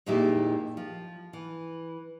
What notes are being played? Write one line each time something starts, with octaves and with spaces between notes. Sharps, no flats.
F2 A#2 D#3 G#3 E4 G4
F3
E3